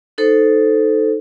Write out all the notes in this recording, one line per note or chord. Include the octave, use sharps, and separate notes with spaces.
D#4 A4 C5